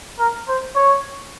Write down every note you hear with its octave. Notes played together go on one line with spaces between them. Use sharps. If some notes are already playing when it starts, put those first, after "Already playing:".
A#4
C5
C#5